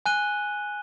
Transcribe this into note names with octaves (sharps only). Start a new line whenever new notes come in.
G#5 F#6 D#7 G7